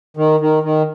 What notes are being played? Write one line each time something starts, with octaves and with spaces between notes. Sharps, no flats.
D#3
D#3
D#3